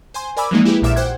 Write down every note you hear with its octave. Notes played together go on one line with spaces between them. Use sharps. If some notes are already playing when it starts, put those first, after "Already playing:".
C5 G#5 C6
A#4 D5 G#5 B5 D6 E6
E3 F3 G#3 A#3 D#4
E4 G4 G#4 B4
A#1 A#2 E5 D6 F6 E7
C5 F#5 G5 F#6 G#6